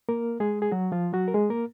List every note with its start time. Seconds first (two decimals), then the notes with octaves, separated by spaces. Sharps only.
0.09 A#3 A#4
0.40 G#3 G#4
0.62 G#4
0.72 F#3 F#4
0.92 F3 F4
1.13 F#3 F#4
1.28 A#4
1.34 G#3 G#4
1.50 A#3 A#4